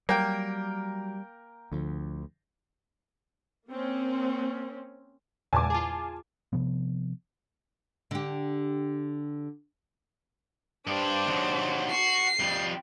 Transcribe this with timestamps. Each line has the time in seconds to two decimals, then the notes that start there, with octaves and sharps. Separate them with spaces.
0.09 F#3 G3 A#3 F#4 A#4 G5
1.72 D2 D3 F3
3.68 A#3 C4 C#4
5.53 E2 A#2 C#3 G#5 A5 D6
5.70 F4 G#4
6.53 C3 F3 B3
8.11 D3 G4
10.87 G2 D4 G4 C5
11.27 D#2 F#3
11.91 F#4 C7
12.40 F2 G3